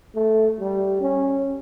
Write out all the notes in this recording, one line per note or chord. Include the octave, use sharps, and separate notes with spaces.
A3
G3
C#4